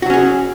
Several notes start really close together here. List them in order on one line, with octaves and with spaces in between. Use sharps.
F#4 F#3 C#4 G#4